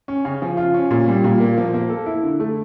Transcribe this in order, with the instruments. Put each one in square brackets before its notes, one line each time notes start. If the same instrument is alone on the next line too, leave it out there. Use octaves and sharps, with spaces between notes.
[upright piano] C#4
C#3
F3
F4
C#4
A#2
G3
A#2
A#3
F3
A#3
A4
E4
D3
A3